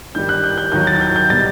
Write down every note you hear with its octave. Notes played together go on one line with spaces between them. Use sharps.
G2 D#3 G3 G6
F#6
G6
G6
D#2 D#3 F#3 G6
A6
G6
G6
B2 G3 A6